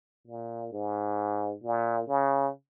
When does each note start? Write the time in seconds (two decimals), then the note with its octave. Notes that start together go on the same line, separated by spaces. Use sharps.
0.27 A#2
0.72 G#2
1.63 A#2
2.07 C#3